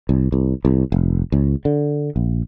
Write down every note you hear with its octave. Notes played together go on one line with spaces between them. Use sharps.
C2
C2
C2
F1
C#2
D3
A#1